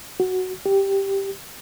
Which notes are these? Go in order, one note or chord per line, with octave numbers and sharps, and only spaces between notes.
F#4
G4